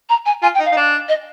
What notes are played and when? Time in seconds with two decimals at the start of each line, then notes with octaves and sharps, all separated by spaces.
0.09 A#5
0.26 G#5
0.42 F4 G#5
0.55 G5
0.60 D#4
0.65 F5
0.72 D#4
0.76 D4
1.09 D#5